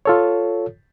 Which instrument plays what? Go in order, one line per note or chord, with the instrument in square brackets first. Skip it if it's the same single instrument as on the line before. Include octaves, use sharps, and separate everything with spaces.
[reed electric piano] F4 A4 C#5